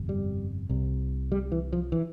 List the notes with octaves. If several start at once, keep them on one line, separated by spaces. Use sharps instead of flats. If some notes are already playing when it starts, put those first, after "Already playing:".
Already playing: G1 F2 C3
G3
C2 C3
G3
E3
F3
E3